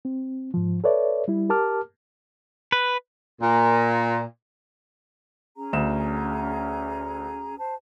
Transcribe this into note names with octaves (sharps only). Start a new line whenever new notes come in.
C4
G#2 F3
A4 B4 C#5 D5 E5
G3 E4
G4 A#4 A5 D6 F6
B4
A#2
C#4 G#4 A#5
D2 E7
C5 A5